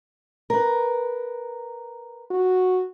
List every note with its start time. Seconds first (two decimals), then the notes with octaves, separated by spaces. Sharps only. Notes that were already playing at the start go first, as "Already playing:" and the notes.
0.50 A#4 B4
2.31 F#4